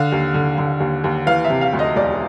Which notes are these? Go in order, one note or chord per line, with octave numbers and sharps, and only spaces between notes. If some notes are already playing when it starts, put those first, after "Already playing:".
Already playing: D3 F5
D#2
D3
D3
D#2
D#2
E3 F5
E5
C3
F5
D2
D#5
E1 D5